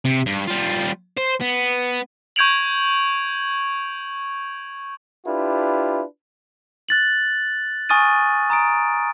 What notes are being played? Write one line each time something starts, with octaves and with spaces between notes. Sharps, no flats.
C3
G2
G3 F4
C5
B3
C#6 G6 G#6 D7 F7 F#7
D4 E4 F4 G4 B4
F#6 A6 F#7
G#5 C#6 D#6 F6 A6 D#7
A#5 D#6 D7